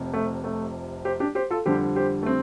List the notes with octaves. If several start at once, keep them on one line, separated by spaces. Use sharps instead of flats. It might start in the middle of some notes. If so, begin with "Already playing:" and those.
Already playing: F1 F2 C3
A3
A3
G4 C5
D4 G4
G4 C5
F4 A4
F2 D3 G3 G4 C5
G4 C5
A3
C4